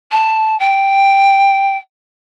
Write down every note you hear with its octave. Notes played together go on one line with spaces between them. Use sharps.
A5
G5